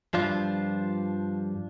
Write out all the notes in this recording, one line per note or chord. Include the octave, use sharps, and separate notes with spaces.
G2 F3 D4 F4